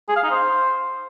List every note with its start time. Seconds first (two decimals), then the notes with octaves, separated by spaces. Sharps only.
0.09 G#4
0.16 F5
0.24 D#4
0.31 C5